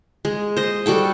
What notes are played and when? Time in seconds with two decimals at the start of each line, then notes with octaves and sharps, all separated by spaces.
0.25 G#3
0.57 C5 D#5
0.86 G3 F#4 A4 G5